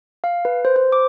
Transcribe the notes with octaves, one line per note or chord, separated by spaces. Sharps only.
F5
B4
C5
C5
D6